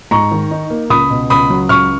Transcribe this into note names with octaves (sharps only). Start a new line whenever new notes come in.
G#2 A#5 C#6
D#3
D#4
A#3
C#2 B5 D#6
B2
C#2 B5 D#6
F#3
C#2 C#6 F6